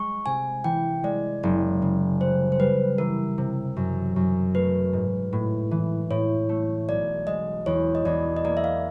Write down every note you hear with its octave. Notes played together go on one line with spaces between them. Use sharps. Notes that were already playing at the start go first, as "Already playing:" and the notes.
Already playing: G#3 C#6
C3 G#5
E3 G5
G#3 D5
F#1
C#3
G3 C5
C5
G3 B4
E3 A#4
C3
F#2
F#2
A3 B4
G#2
A2
E3
A2 C#5
A3
B1 D5
G#3 D#5
E2 C#5
D#5
E2 D5
D#5
A#3 D5
E5
F5